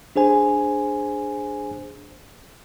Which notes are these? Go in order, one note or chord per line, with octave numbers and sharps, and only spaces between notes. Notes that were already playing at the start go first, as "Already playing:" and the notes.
D4 G#4 C5 G#5